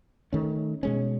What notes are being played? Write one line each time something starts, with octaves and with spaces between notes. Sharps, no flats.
D#3 A3 C#4
B2 G#3 C#4